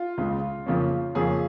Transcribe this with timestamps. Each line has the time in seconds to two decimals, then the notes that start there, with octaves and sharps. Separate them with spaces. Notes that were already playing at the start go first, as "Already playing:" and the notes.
Already playing: F4
0.18 C#2 C#3 G#3
0.66 F2 C#3 F3 A#3 C#4
1.15 F2 C#3 F3 A#3 C#4 G#4